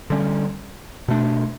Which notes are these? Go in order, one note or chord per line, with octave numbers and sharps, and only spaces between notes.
D3 G3 C#4
B2 A3 D4